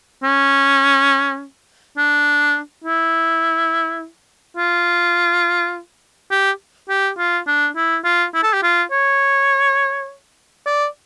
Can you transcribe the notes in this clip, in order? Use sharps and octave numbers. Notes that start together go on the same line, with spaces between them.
C#4
D4
E4
F4
G4
G4
F4
D4
E4
F4
E4
A4
G4
F4
C#5
D5